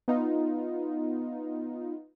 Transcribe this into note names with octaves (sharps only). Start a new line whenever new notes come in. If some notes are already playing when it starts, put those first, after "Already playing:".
B3 D#4 F4